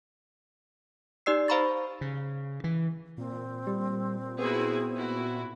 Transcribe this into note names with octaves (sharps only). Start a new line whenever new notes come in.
D#4 G4 D5 E6 C7
C5 F5 A#5 B5 C#6 A6
C#3
E3
A#2 C4
G3
B3 E4 F#4 G#4
E4 F#4